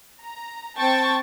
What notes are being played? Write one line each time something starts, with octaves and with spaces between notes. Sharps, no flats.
A#5
C4 G5 A5 C#6 A6